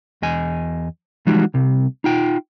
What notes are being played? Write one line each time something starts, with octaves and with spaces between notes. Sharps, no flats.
E2 D#5 G#5
E3 F3 G3 G#3 D#4 F#4
C2 C3
D#4 F4 G5